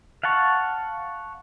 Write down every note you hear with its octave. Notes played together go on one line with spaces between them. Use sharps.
F5 F#5 A5 C#6